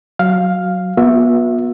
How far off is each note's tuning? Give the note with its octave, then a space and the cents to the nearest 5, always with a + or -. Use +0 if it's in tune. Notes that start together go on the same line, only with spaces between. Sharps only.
F#3 +0 F5 +0
B3 -35 F#4 -45 E5 +0